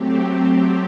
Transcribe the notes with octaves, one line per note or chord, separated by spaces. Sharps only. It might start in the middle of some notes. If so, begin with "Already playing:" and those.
Already playing: F#3 A3 C4 G4